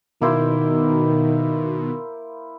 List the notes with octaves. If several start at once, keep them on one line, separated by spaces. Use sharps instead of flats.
B2 D#3 A#3 E4 C5